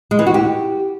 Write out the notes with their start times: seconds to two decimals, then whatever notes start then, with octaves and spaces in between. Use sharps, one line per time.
0.11 G#3
0.19 E3
0.27 F#4
0.34 G4